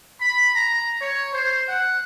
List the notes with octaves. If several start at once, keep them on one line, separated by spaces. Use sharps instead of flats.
B5
A#5
C#5
C5
F#5